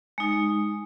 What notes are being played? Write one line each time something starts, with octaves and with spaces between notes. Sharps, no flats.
G#3 D#4